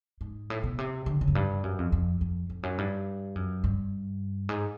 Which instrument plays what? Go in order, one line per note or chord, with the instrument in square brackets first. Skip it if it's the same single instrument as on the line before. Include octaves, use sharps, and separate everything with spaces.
[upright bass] G#2
A2
B2
C3
D3
C#3
F#2
G2
F#2
F2
F2
F2
F2
F#2
G2
F#2
G2
G#2